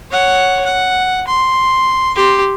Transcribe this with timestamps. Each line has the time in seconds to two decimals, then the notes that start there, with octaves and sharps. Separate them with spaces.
0.11 C#5 F#5
0.65 F#5
1.27 C6
2.16 G4 C6